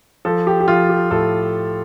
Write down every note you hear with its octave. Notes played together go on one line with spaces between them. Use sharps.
F3 A4
G4
G4
F3 F4
G4
A2 A4